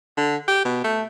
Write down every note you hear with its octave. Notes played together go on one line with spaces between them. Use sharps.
D3
G4
B2
A3